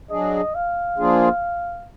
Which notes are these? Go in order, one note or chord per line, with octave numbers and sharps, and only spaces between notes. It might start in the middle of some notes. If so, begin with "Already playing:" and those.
F#3 D4 G#4 D#5
F5
F3 A#3 D4 F4 G#4